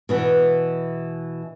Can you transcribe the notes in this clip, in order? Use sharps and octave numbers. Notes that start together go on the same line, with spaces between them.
B2 E3 B3